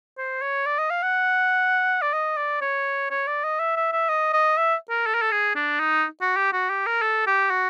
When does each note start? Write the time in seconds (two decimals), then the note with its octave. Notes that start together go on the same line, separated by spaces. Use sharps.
0.18 C5
0.42 C#5
0.66 D5
0.78 D#5
0.90 F5
1.02 F#5
2.02 D5
2.13 D#5
2.37 D5
2.61 C#5
3.10 C#5
3.27 D5
3.44 D#5
3.59 E5
3.76 E5
3.93 E5
4.09 D#5
4.33 D#5
4.57 E5
4.90 A#4
5.07 A4
5.14 A#4
5.22 A4
5.31 G#4
5.55 D4
5.80 D#4
6.21 F#4
6.36 G4
6.53 F#4
6.70 G4
6.86 A#4
7.02 A4
7.27 G4
7.50 F#4